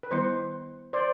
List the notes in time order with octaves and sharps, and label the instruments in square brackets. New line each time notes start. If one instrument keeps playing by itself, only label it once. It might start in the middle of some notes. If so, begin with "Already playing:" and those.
[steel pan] B4
[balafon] D#3 G3 B3 E4 [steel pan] C5
[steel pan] C5 D5